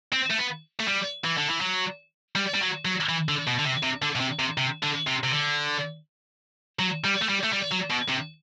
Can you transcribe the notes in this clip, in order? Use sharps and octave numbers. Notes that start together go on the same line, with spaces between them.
C4
A3
B3
A3
G3
E3
D3
E3
F#3
G3
G3
F#3
F#3
E3
D3
B2
D3
C3
C3
D3
B2
C3
C3
C3
D3
C3
C3
D3
F#3
G3
A3
G3
A3
G3
F#3
B2
C3